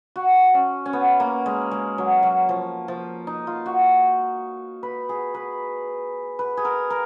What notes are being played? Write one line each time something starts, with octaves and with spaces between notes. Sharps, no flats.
F#4
C#4
C#4
B3
A#3
G#3
G#3
F#3
F#3
F3
F3
D#4
F4
F#4
B4
G#4
B4
B4
G#4
A#4
A#4